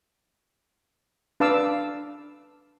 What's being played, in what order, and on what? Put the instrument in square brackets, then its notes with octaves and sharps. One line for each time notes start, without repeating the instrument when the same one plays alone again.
[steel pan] D4 B4 F5 A5 D6 E6